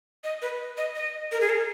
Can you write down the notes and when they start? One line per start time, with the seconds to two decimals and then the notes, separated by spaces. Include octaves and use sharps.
0.24 D#5
0.42 B4
0.77 D#5
0.96 D#5
1.32 A#4
1.41 G#4
1.50 A#4